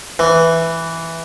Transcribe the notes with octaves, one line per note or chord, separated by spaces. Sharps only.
E3